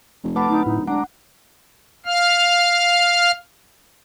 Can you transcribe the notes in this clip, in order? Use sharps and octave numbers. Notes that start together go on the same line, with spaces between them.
F1
A3 B4 F#5 A5 B5 D6
D1 D#4
A2 D#4 E4
G#3 D4 F#5 A#5 D6
F5 F6